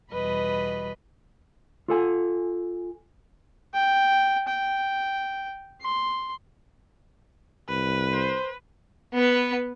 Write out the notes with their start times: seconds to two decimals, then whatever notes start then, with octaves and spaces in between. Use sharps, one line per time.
0.12 E2 B2 G3 B4 D#5 B5
1.88 F4 A4 G#5
3.74 G5
4.48 G5
5.82 C6
7.69 C2 B4
8.12 C5
9.13 B3 B4